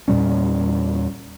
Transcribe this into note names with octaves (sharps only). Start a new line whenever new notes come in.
E2 A#2 G3 C#4